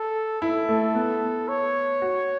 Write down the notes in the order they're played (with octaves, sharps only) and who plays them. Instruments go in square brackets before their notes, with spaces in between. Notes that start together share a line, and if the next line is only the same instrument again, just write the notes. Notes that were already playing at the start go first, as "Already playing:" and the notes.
Already playing: [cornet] A4
[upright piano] E4 [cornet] A4
[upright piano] A3
B3
[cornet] C#5
[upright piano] F#4